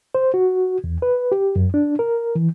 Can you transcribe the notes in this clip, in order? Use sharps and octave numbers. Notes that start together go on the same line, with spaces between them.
C5
F#4
E2
B4
G4
F#2
D4
A#4
E3